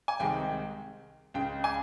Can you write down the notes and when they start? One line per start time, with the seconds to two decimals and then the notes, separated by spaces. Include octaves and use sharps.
0.08 G#5
0.20 C2 C3 D#3 G#3 G5
1.34 C#2 C#3 G#3 G5
1.64 G#5